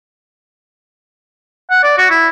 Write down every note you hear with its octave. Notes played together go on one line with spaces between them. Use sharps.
F#5
D5
F#4
E4